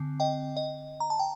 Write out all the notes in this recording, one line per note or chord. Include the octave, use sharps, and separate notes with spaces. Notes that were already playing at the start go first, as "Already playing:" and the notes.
Already playing: D3 C4
D#5 G5
D#5
A#5
A5
G5